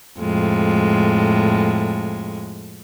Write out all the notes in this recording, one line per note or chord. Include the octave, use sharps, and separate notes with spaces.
F2 A2 G#3